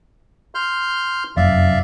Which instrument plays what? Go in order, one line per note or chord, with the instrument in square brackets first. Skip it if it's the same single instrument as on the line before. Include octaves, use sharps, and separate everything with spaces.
[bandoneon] C6 F6 G6
[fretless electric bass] F1 F#2 [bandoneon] D5 E5 F5